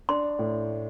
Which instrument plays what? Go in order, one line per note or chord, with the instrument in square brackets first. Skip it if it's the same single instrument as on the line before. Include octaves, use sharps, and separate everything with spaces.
[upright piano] D4 [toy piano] C6
[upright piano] A2